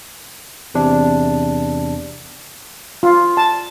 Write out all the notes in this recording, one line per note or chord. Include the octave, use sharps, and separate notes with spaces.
E2 C3 D4
F4
A5